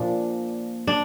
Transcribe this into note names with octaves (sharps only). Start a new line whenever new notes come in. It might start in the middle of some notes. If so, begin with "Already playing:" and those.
Already playing: A#2 F3 D4
D4